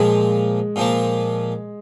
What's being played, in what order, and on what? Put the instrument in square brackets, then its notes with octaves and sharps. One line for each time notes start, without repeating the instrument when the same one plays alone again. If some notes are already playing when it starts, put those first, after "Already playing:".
Already playing: [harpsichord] A#2 F3 A#3 [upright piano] G#3
[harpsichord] A#2 F3 A#3